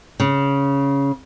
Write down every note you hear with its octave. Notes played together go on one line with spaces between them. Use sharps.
C#3